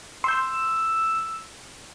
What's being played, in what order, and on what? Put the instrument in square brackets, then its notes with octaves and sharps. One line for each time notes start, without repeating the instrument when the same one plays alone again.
[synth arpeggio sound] C6 G6 [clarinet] E6